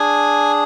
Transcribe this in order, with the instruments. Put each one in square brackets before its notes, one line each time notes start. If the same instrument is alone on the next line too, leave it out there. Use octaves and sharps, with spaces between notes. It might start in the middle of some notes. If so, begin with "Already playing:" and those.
Already playing: [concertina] D4 G#4 G#5